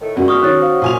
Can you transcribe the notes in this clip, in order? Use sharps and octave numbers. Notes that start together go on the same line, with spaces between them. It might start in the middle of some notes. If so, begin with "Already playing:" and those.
A2 D#3 A3
G1 C#2 F#4 A#4 D5
C#6 D#6 F6
D#3 C#4 F#6 A6
C5 C#5 F5
F#2 A#2 G#5 F7